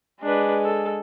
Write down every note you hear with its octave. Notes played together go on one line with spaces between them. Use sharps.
G#3 D4 B4
A4